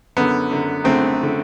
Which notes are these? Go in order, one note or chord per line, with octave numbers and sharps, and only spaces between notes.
F#2 D3 B3
F#2 D3
F#2 D3 A3 C4
D3